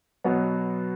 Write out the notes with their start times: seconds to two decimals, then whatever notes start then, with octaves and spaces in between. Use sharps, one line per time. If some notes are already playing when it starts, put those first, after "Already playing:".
0.24 B2 F#3 B3 F#4